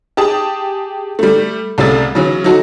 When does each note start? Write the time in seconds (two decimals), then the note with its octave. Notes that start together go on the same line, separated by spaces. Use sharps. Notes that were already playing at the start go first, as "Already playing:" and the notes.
0.17 G4 G#4 A5 D#6
1.19 G3 A3
1.78 C2 C#3 G3 A3 E6 A6
2.15 C#3 E3 F#3 C#4
2.44 F#3 D#4 F#4 A4